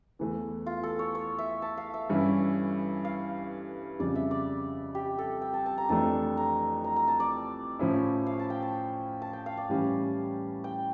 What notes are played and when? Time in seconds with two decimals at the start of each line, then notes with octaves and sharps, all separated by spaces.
0.19 E2 E3 A3
0.66 F4
0.83 A4
0.99 C#5
1.15 C#5
1.39 E5
1.62 A5
1.78 F5
1.94 E5
2.10 G2 E3 G3 C#4 E4
3.05 F5
3.99 F2 C#3 G3 D5
4.15 E5
4.31 D5
4.95 G4
5.18 A4
5.42 G5
5.53 A5
5.66 A5
5.78 A#5
5.89 F2 E3 A3 D4 A5
6.37 A#5
6.84 A#5
6.96 A#5
7.08 A5
7.20 D5
7.79 A2 F3 C#4 E4
8.26 F5
8.39 A5
8.50 G5
8.62 A5
9.22 A5
9.33 G5
9.46 F5
9.57 D5
9.69 A2 E3 G3 C#4 G4
10.64 G5